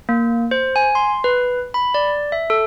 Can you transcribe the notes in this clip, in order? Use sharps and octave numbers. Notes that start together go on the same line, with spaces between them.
A#3
C5
G#5
C6
B4
B5
D5
E5
A4